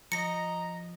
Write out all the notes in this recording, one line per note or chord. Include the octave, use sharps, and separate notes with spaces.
F3 D#5 A#5 A#6 C#7